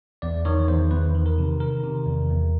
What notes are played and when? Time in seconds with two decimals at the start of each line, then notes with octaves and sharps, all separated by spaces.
0.22 E2 D5
0.45 D#3 C#5
0.68 E2 C5
0.91 E2 B4
1.15 D#3
1.26 A#4
1.38 C3
1.60 D#3 A#4
1.83 C3
2.07 E2
2.30 E2